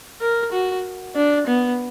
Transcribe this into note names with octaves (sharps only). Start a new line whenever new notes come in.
A#4
F#4
D4
B3